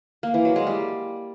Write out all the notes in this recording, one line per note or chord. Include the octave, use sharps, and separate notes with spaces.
A#3
E3
F#3
G#3
G3